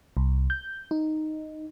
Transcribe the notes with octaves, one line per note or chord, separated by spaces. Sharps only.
C2
G6
D#4